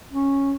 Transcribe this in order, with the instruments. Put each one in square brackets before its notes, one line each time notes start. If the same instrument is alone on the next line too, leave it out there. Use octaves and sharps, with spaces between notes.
[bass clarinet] C#4